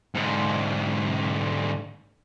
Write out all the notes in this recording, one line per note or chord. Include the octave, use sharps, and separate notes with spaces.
G#2 D3